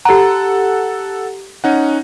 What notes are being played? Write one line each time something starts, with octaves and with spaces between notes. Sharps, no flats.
G4 A4 F#5 A#5
C#4 D#4 F#5